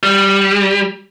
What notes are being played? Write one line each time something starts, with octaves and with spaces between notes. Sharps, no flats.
G3